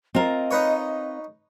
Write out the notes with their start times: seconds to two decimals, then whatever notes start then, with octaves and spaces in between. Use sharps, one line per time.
0.15 C4 F4 A#4 D#5
0.51 D#4 B4 C#5